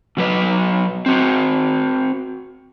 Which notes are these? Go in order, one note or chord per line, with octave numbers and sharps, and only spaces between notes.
B2 F#3 B4 D#5
C4 F#4